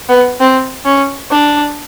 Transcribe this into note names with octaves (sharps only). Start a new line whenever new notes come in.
B3
C4
C#4
D4